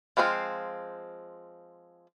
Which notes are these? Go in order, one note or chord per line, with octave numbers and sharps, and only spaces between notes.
F3 G#3 C4 E4 F4